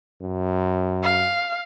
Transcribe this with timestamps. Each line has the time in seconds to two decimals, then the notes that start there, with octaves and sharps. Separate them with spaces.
0.21 F#2
1.03 F5